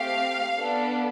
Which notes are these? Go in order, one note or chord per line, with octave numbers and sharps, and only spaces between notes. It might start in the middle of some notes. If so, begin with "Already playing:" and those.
Already playing: A3 C4 G4 F5
B3 D4 A4